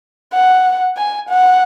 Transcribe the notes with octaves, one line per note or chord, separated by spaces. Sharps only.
F#5
G#5
F#5